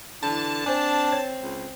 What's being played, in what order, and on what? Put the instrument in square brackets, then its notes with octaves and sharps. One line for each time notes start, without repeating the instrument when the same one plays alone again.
[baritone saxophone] D3 [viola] E3 [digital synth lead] A5
[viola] C4 [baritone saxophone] D4 [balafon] C5 G#5
[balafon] C#5
[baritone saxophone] C#2